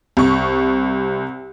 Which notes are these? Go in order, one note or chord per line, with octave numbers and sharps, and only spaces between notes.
C2 C#6